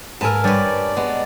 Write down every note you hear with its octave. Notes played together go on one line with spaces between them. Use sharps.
G#2 A#4 B4 G#5 A5 E6
G2 G3 G4 B4 C#5 D5
G#3 B3